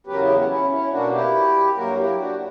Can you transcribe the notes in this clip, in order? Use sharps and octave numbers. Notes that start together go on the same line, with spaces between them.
E2 C#3 F#3 B3 G4 B4
A#4
E4 G4
C#4 E4
C#4 E4
C#4 E4
B2 A#3 D4 F#4
E4 G4
G2 F#3 A#3 F#4 A#4
F#4
E4 G4
D4 F#4